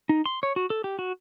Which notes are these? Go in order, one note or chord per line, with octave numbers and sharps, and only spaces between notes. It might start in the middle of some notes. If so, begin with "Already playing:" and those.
D#4
C6
C#5
F#4
A4
G4
F#4